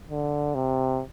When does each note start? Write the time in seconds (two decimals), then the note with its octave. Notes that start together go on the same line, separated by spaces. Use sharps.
0.10 D3
0.55 C3